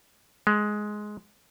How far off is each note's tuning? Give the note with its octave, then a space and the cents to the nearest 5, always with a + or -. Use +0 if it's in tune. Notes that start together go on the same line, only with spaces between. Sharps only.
G#3 +10